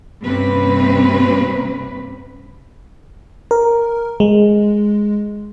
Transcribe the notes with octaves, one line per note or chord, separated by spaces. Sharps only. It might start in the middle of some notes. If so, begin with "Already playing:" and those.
G2 C3 A#3 C4 C#4 B4
A#4
G#3